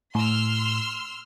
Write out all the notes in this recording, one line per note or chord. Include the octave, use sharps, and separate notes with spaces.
A2 C6 E6 F6